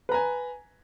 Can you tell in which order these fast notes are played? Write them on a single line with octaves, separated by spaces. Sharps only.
B4 A#5 G#5